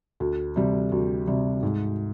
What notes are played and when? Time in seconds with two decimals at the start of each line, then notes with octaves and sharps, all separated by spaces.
0.20 D2
0.56 C3 G3
0.92 D2
1.27 C3 G3
1.63 G#2